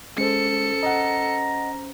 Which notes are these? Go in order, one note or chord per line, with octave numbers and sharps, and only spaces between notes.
G#3 C#4 A4 C5 C#7
D#5 F#5 A#5